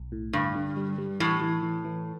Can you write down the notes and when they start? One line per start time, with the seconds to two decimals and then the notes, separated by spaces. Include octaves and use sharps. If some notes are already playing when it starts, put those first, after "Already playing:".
Already playing: B1
0.12 A2
0.33 G2 D3
0.55 D3
0.76 G3
0.98 G3
1.20 A2 E3
1.41 E3
1.63 E3
1.84 E3